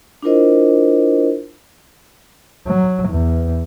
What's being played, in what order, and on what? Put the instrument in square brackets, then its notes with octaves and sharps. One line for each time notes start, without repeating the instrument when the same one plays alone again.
[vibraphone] D4 E4 F4 A#4 C5 D#5
[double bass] F#3
E2